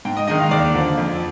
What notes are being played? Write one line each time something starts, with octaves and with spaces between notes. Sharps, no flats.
G#2 G5
D#5
D#3 G#3 D#4 D#5
F5
D#2 D5
D3 F3 A#3
F2